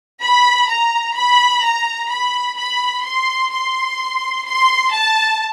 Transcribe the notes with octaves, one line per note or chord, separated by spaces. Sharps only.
B5
A#5
B5
A#5
B5
B5
C6
C6
C6
A5